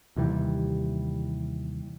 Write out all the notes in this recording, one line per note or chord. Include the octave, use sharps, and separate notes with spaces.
D#2 C3 E3 G3